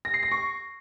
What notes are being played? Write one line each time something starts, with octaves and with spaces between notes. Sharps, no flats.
A#6
C7
A#6
C#6